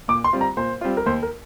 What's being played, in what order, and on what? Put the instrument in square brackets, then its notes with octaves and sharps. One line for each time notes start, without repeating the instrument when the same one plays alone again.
[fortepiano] A#2 [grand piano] D6
[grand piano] C6
[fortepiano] G3 C4 F4
[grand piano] A#5
[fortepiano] A#2 [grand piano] C5
[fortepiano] G3 C4 F4
[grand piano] A#4
[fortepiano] D#2 [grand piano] C5
[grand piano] A#4